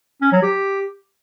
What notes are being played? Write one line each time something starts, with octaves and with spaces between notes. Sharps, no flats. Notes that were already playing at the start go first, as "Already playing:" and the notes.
C#4
F#3
G4